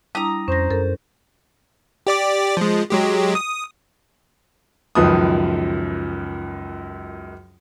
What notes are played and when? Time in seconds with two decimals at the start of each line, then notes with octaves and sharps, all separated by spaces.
0.15 G3 D4 E4 A#5 D#6
0.48 F2 C#4 C5 A#6
0.71 F#2 A4 A#4
2.07 G4 D5 D6
2.57 F3 G#3
2.90 F#3 G#3 G4
3.35 D#6
4.95 C#2 F#2 D#3 F3 B4 D#6